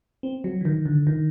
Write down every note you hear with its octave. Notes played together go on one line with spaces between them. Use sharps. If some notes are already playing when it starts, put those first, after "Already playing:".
C4
F#3
E3
D#3
D3
D#3